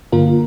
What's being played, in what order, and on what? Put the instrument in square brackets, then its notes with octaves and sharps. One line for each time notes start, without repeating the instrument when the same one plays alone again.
[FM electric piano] G2 D3 A#3 F4 A#4